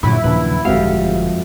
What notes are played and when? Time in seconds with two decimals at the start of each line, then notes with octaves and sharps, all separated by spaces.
0.03 G2 A#2 D3 F#3 E4
0.24 D#2 A#2 C#3 F3 F#3 D4 B4
0.65 G1 F2 A2 G#3 F#4 G4 E5 F5